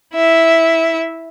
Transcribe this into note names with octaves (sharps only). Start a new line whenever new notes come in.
E4 E5